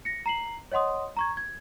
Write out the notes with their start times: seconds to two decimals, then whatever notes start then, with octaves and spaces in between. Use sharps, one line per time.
0.05 A#6 C#7
0.26 A#5 C7 F#7
0.72 C#5 D#5 F#5 C6 D#6
1.17 A#5 C#6 G#6
1.37 G#6